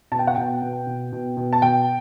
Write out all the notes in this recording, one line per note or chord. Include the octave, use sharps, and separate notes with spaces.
B2 A5
G5
F#5
B2 G5
B2
B2
B2
B2
A5
B2 G5